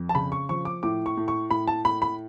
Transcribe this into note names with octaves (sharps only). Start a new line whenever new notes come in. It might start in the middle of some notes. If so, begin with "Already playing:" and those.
Already playing: F2
A5
C#3 B5
C#6
F3 C#6
D6
A2 D6
C#6
A2
C#6
A2 B5
A5
A2 B5
B5